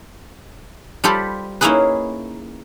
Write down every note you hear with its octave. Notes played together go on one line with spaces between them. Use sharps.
G3 F4 G4 A4 C5 B5
A#3 C#4 D#4 E4 G#4 B4